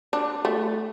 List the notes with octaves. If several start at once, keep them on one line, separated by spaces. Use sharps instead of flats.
D4
A3